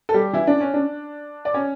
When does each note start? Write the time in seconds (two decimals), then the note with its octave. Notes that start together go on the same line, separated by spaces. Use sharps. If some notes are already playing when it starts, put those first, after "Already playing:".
0.09 A4
0.14 G3 G4
0.33 E3 E4
0.47 D4
0.60 C#4
0.74 D4
1.45 D5
1.54 C#4 C#5